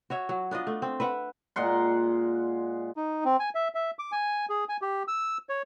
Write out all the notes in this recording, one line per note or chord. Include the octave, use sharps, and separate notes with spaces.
F#4 C#5 E5
F#3
B3 D4 F4 D#5
A3
C4
B4 E5 F#5
A#2 G#3 F#5 C6
D#4
C4
G#5
E5
E5
D6
G#5
G#4
G#5
G4
E6
C#5